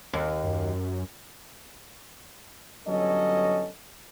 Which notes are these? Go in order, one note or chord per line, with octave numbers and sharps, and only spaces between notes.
D#2
F#2
G1 F#3 C#4 A4 D#5